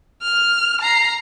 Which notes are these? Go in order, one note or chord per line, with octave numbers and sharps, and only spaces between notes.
F6
A#5 C7